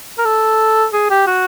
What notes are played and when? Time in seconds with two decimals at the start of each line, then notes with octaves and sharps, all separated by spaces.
0.18 A#4
0.25 A4
0.93 G#4
1.10 G4
1.27 F#4